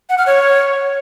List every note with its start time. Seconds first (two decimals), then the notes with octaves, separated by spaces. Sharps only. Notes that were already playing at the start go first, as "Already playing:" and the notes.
0.10 F#5
0.18 F6
0.26 C#5